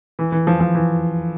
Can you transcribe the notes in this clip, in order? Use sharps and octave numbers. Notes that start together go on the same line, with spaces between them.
E3
E3
F3
F3
E3